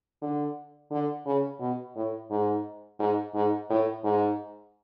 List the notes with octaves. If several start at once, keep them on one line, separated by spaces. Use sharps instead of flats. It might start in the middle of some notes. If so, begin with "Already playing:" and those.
D3
D3
C#3
B2
A2
G#2
G#2
G#2
A2
G#2